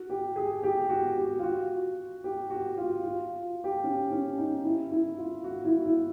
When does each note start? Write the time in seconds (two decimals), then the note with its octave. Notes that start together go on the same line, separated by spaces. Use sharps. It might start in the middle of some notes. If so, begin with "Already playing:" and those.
Already playing: F#4
0.10 G4
0.36 G#4
0.63 G4
0.89 F#4
1.17 G4
1.39 F4
1.43 F#4
2.24 G4
2.50 F#4
2.77 F4
3.04 F4
3.64 G4
3.84 C#4
4.11 C#4
4.38 D#4
4.65 E4
4.91 E4
5.18 F4
5.44 F#4
5.65 E4
5.85 E4